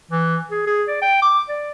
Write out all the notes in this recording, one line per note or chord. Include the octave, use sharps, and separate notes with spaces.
E3
G#4
G#4
D5
G5
D6
D5